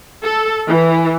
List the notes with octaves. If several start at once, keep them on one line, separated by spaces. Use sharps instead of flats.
A4
E3